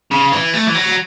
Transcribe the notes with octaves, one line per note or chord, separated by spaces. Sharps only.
C#3
E3
A3
E3
F#3